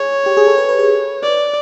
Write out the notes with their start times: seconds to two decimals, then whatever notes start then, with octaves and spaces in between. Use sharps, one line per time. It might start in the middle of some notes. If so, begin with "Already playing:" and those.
Already playing: G#4 C#5
0.26 G4
0.37 G#4
0.47 A4
0.58 B4
0.69 B4
0.79 B4
1.23 D5